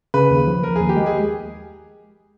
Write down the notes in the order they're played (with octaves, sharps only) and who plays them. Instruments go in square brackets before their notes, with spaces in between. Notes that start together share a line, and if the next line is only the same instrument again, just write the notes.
[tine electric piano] C#3 [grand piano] B4
[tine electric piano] D#2
F3
[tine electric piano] F3 [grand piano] A#4
[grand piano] G#4
[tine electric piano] D#2
[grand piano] G4
[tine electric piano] G#3
[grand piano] G#4